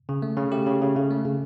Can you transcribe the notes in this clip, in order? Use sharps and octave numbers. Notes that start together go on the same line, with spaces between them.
C#3
A3
C#3
A3 G4
C#3
C#3
C#3
A3
C#3